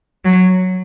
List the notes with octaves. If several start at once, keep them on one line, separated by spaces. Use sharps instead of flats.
F#3